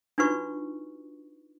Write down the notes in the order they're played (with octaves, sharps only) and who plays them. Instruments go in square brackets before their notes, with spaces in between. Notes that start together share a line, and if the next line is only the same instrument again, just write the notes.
[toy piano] D4 D#4 F4 F#4 B4 C#6